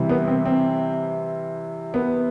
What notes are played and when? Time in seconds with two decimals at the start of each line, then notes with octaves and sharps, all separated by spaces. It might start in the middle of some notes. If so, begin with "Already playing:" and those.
Already playing: C3 E3 G3
0.09 B3
0.28 C4
0.45 C4
1.94 B3